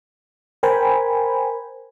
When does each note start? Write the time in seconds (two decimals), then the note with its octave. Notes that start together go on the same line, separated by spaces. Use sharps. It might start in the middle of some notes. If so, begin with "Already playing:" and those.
0.63 A#4 C5 G5 G#5 B5